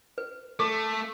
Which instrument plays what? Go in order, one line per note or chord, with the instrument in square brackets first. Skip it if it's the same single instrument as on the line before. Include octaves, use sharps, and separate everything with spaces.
[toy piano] B4
[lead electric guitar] A3 [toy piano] A4 C#6